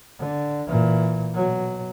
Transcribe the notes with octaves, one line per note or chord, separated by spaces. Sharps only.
D3
A#2 E3
B2 F#3